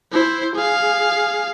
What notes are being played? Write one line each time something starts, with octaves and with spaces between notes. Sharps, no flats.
E4 C5
G#4 F5